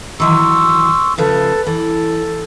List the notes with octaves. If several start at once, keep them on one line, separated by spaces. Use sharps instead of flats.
D#3 E3 F#3 C6 C#6 E6
C#3 F3 A3 A4 B4
E3 A4